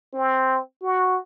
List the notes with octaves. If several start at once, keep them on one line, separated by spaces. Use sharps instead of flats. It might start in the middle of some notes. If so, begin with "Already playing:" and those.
C4
F#4